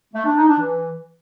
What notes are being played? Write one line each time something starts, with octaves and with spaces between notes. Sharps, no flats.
A3
D4
D#4
D4
E3